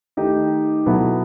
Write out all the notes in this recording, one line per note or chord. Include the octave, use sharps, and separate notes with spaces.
D#3 A3 D#4 G4 D#5
B2 F#3 B3 E4 A4